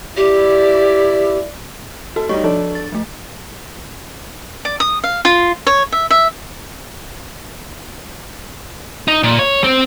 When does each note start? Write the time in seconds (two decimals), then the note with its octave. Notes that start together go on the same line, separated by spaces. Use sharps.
0.17 E4 G4 D5
2.16 F#4 A4
2.29 G3 D#4 C#5 D#5 C#6
2.44 F3 D4 A4 D5
2.75 A6
2.92 F3 A3
4.65 D5
4.80 D#6
5.04 F5
5.25 F4
5.67 C#5
5.92 E5
6.11 E5
9.08 D#4
9.23 A#2
9.39 C#5
9.64 C4